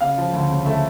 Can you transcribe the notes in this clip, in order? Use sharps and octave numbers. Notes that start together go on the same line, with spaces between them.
C#3 F5
F3
D2
C#3
A3 E5